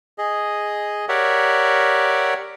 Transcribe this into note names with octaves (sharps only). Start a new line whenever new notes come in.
G#4 D#5
G4 A#4 C#5 D5 E5 F#5